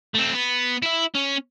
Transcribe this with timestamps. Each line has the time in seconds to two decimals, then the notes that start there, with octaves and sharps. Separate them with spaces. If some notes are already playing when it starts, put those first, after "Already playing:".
0.15 A3 C4
0.34 B3
0.82 E4 E5
1.15 C#4